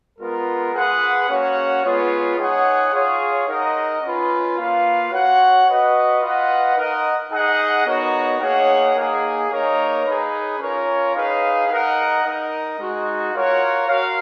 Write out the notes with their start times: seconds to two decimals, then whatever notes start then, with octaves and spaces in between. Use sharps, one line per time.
0.19 G#3 B3 F4 A#4
0.74 F4 G#4 B4 F#5
1.28 A#3 C#4 F#4 C#5 F#5
1.83 G#3 B3 F4 G#4 C#5
2.37 D#4 G#4 C#5 F#5
2.93 F4 G#4 C#5
3.47 D#4 A#4 D#5 F#5
4.02 C#4 F4 B4
4.57 A#3 F4 B4 F5
5.12 F#4 C#5 F#5
5.66 F#4 B4 D#5 F#5
6.21 F4 B4 D#5 F#5
6.76 D#4 A#4 D#5 F#5
7.31 D#4 G#4 D#5 F#5
7.86 B3 D#4 F#4 A#4 C#5
8.40 A#3 D#4 G#4 C#5 F#5
8.95 A#3 D#4 G#4
9.50 A#3 D#4 A#4 C#5
10.05 D#4 G#4 B4
10.59 C#4 F4 A#4 C#5
11.15 D#4 G#4 B4 F5
11.69 D#4 A#4 D#5 F#5
12.24 D#4 A#4 D#5
12.79 G#3 D#4 F#4
13.33 F4 A#4 C#5 F#5
13.88 F#4 A#4 F5